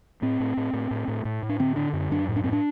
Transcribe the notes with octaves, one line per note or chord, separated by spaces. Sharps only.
A2 C4
A2
A2
A2
A2
A2
A2
A2
D4
D3 C4
D3 D4
F#2
F#2 D4
A2
D4
A2 C4
D4